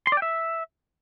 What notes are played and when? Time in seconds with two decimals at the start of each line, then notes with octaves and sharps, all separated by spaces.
0.07 C6
0.12 D5
0.17 G5
0.22 E5